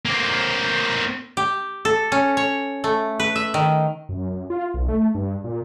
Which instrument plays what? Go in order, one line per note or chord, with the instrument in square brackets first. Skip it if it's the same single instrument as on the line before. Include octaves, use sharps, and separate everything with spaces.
[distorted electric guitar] A#3 C4
[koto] G4
A4
C#4
C#5
A3
B4
E5
D#3
[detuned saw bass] F#2
F#2
F4
B1
A3
G2
A#2